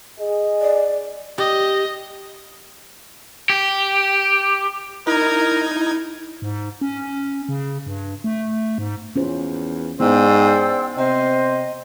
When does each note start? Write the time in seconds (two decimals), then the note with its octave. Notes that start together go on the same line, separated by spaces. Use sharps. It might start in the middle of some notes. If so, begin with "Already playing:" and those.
0.19 G#4 D#5
0.62 D5
1.38 G4 D#5
3.50 G4
5.07 D#4 E4 A#4 G#6
6.42 G#2
6.81 C#4
7.49 C#3
7.86 G2
8.24 A3
8.78 G#2
9.16 E2 C#4 F4 C5
10.00 G#2 B3 E4 C5 D5 G5 E6
10.98 C3 C5 D#5